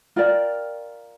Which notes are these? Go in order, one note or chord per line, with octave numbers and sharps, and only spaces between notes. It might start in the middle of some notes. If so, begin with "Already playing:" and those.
F4 A#4 D5 G5